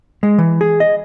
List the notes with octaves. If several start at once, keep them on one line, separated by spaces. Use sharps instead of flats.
G#3
E3
G#4
D#5